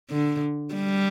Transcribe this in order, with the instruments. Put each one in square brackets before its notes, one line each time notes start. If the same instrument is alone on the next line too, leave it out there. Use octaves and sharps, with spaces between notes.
[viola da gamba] D3
G3